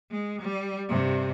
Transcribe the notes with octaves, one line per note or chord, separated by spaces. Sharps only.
G#3
G3
G2 C3